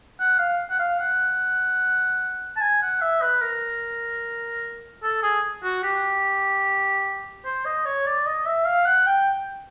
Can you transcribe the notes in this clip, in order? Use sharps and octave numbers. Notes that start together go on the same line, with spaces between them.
F#5
F5
F#5
F5
F#5
A5
G#5
F#5
E5
B4
A#4
A4
G#4
F#4
G4
C5
D#5
C#5
D5
D#5
E5
F5
F#5
G5